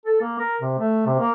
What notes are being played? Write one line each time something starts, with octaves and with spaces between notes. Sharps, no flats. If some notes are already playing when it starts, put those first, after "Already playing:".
A4
A#3
A#4
C3
A3
C3
A#3